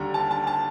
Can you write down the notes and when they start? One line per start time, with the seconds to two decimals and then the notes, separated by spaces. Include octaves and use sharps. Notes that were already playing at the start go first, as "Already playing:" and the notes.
Already playing: D#2 D3 G3 A#5
0.14 A5
0.31 A5
0.47 A5